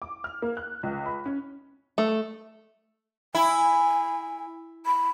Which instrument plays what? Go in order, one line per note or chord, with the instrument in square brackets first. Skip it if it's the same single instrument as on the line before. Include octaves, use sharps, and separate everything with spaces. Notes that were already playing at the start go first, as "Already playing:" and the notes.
[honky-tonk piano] D6
F6
A#3
F#6
C#2
B5
C#4
[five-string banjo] A3
[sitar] E4 [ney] G#5
[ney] B5